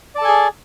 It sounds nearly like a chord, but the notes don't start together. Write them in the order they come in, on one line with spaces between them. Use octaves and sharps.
D5 A5 A4 G#5 G#4